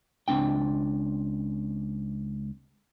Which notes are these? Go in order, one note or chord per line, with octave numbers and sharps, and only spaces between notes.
C#2 C4 D4 G5